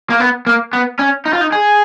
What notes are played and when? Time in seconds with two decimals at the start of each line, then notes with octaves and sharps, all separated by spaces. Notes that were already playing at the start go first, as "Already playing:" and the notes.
0.10 A#3
0.20 B3
0.47 A#3
0.73 B3
0.99 C#4
1.26 D#4
1.34 F4
1.41 D#4
1.52 G#4